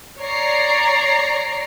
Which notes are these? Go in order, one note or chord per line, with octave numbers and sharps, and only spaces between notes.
C#5 D5 A#5 C7